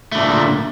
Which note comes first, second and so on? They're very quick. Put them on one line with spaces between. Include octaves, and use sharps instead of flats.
A3 D3 A#2